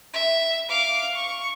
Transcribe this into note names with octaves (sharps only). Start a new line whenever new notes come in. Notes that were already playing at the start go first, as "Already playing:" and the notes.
E5
F5 D6
C#6